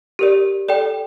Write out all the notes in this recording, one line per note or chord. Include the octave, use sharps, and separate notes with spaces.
G4 A#4 D5
A4 D5 G5